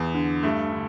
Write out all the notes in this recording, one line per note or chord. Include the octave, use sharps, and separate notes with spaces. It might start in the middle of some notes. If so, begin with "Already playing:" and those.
Already playing: E2
D3
G2 A3
D3